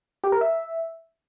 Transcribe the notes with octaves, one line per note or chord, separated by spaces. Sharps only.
G4
A#4
E5